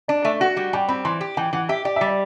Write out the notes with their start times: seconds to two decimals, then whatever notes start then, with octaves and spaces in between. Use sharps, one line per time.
0.08 D4 D5
0.25 A3 E5
0.40 F#4 F#5
0.57 G3
0.73 G3 G5
0.88 C4 B5
1.05 E3 C6
1.21 G4
1.37 E3 G5
1.53 E3 F#5
1.69 G4 E5
1.85 G4 D5
1.96 G3 E5
2.07 D5